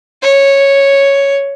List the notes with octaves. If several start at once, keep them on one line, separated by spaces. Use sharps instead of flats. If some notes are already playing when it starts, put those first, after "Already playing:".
C#5